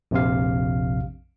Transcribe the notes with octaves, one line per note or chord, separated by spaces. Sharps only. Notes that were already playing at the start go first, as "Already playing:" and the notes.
A#1 F2 C3 F5